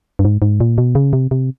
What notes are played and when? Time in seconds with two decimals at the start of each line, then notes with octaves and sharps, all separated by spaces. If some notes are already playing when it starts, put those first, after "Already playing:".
0.19 G2
0.25 G#2
0.42 G#2
0.60 A#2
0.78 B2
0.95 C#3
1.13 C3
1.31 C3